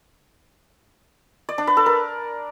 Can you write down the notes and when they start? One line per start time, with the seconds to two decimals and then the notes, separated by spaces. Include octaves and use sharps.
1.49 D5
1.58 D4
1.67 B4
1.77 A4
1.86 A#4